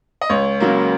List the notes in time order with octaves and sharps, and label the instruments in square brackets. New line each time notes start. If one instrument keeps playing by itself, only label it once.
[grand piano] D#5
C#2 C#5
C#3 F#3 A#3